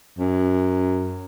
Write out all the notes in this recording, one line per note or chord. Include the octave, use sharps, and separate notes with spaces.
F#2